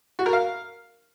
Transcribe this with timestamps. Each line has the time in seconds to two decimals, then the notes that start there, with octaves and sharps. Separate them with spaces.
0.19 F#4
0.26 A#4
0.33 F5